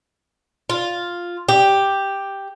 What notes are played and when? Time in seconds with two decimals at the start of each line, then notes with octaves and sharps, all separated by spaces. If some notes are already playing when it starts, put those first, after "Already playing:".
0.70 F4
1.48 G4